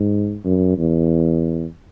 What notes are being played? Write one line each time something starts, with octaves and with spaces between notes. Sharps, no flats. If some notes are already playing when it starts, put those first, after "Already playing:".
Already playing: G#2
F#2
E2